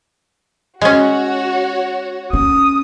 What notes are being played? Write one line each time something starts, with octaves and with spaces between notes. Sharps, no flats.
G#3 C#4 F#4 C#5
C#4 D#6